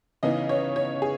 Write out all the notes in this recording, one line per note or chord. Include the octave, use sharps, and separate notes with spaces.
C#3 E3 B3 D#4 D#5
C#5
C#5
G#4